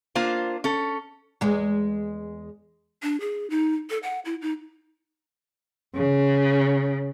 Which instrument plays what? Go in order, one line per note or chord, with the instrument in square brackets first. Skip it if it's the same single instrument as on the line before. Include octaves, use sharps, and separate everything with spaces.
[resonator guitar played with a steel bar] A#3 D4 F4 C5
C#4 A4
[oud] E2 G#3
[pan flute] D4
G#4
D#4
A4
F#5
E4
D#4
[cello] C#3